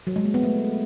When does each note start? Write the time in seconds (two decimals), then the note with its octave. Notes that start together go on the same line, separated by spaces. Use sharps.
0.07 F#3
0.16 G#3
0.25 A#3
0.34 B3
0.43 A3